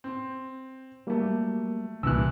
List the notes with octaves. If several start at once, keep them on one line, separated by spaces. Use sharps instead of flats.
C4
F#3 G3 A3 A#3
C2 G2 A#2 E3 E6 F#6